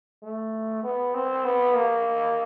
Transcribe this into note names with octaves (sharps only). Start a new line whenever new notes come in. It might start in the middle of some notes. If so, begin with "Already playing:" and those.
A3
B3
C4
B3
A#3